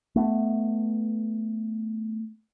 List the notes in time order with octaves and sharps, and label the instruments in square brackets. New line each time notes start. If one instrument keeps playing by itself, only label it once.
[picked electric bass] A3 B3